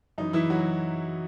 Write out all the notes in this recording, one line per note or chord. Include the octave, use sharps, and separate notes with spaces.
F#2 E3 D#4
E3 E4
F#3 F#4